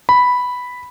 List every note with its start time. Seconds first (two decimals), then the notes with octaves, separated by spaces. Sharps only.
0.09 B5